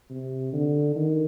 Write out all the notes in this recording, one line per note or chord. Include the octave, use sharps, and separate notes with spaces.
C3
D3
D#3